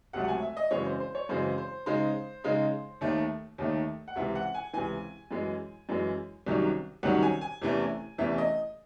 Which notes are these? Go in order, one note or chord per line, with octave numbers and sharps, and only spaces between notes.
C#2 C3 F#3 A3 F#5
F#5
G#5
E5
D#5
F#2 C#3 E3 G#3 C4 C#5
C5
C5
C#5
F#2 C#3 E3 G#3 C4 C5
C5
C#3 G#3 D#4 C5
C#3 G#3 D#4
D#2 D#3 A3
D#2 D#3 A3
F#5
C#2 C3 E3 E5
F#5
G#5
C#2 C3 E3 G#5
F#2 E3 G#3
F#2 E3 G#3
C2 C3 D#3 F#3 C#4
C2 C3 D#3 F#3 C#4 F#5
G#5
G#5
E2 C3 E3 A3 C#4
E2 C3 E3 A3 C#4 E5
D#5